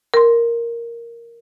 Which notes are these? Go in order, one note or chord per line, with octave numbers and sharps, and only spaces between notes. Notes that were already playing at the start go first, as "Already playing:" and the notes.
A#4 C6